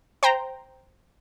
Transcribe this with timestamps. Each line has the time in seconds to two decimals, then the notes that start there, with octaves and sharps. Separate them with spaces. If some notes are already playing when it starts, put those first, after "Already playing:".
0.23 C5 G5 A#5